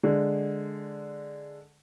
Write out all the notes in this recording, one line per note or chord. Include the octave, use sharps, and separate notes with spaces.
D3 G#3